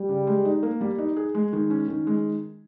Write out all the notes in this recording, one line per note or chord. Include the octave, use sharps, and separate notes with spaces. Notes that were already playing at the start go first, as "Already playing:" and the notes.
Already playing: G3
C#3
G#3
D#4
A#3
G3
D#4
G#4
G#3
D#3
C#4
D#3
G#3